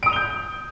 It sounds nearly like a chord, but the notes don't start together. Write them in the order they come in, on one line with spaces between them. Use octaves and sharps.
D7 D#6 F7 G7 G6